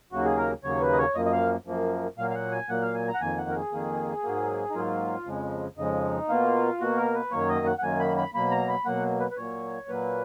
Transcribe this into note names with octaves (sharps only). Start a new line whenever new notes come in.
D#2 C#3 F#3 A#3 F#4
G#4
A#4
D#2 C#3 F#3 A#3 C#5
B4
D#5
C#5
F#2 F3 A#3 D#5
D#5
F5
F#2 F3 A#3
A#2 F#3 A#3 F5
F5
F#5
G#5
A#2 F#3 A#3 F#5
F5
G#5
A#5
F#5
F2 D#3 A#3 G#5
F#5
A#4
G#4
F2 D#3 A#3
G#2 F#3 A#3
D#4
G#2 F#3 A#3 F4
F2 C#3 F3 G#3
F2 C#3 F3 G#3 D#4
B2 A#3 F4
B2 A#3 F#4
A#4
B4
F#2 D#3 F#3 A#3 C#5
D#5
F#5
F#5
F#2 D#3 F#3 A#3 G#5
B5
B5
B2 F#3 A#3 B5
A#5
B5
B2 F#3 A#3 F#5
B4
B4
A#2 F#3 A#3 C#5
A#2 F#3 A#3 B4